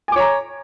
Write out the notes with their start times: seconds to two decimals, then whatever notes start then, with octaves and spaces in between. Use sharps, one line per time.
0.08 G#5
0.12 D6
0.16 C#5
0.20 A#5